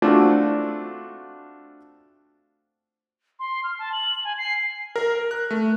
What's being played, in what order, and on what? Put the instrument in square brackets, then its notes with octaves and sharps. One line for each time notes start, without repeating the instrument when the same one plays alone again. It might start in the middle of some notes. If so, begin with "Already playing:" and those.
[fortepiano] A3 C4 D4 F4 F#4
[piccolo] C6
F6
A5
F#7
G#5
C7
[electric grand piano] A#4
F#6
A3